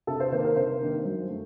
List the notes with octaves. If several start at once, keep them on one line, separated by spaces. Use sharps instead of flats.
C3 A4
C5
D#3 A#3 C5
A#4
C3 C5
D#3 A#3
F#2
A3